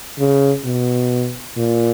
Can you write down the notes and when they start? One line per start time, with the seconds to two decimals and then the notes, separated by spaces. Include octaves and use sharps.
0.19 C#3
0.65 B2
1.57 A#2